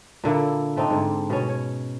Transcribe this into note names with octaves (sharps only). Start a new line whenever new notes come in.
A#2 D3 A#3 E4
A3 C4 D4 D#4
G#2 D3
B2 C#4
C#5